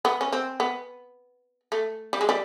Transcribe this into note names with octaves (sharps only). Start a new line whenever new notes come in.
B3
C#4
C4
B3
A3
G3
G#3
G3